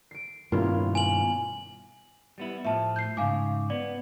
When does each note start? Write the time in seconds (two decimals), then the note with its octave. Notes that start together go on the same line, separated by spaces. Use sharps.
0.11 C7 D7
0.52 G2 B2 D#3 A#3 C#4 E4 F4
0.95 G#5 F#7
2.38 G3 B3 E4
2.65 A2 F3 E5 A5
2.96 G6 C7
3.17 G#2 C#3 F5 G#5 D6
3.70 B3 D5